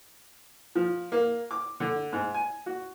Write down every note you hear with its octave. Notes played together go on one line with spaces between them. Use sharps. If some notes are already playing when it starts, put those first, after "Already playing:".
F3
A#3
D6
D3
G#2
G#5
F#4